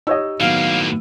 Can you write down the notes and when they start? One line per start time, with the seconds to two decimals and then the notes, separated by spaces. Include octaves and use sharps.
0.07 D#4 G4 C#5 D#5 E6
0.40 A2 D#3 F#3 A#3 B3 F5